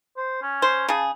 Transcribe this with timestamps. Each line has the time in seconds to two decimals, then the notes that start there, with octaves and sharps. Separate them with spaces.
0.17 C5
0.43 C#4
0.62 C5
0.89 C#3 G#4 A5